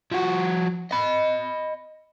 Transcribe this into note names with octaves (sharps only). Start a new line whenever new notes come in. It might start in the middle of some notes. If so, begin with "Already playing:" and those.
F3 F#4
D#5 B5